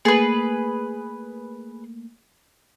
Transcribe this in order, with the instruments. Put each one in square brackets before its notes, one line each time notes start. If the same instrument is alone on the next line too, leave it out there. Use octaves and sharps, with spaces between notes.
[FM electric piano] A3 A#3 [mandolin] G#4 B4